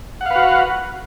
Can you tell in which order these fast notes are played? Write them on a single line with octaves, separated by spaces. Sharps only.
F#5 F5 B4 F#4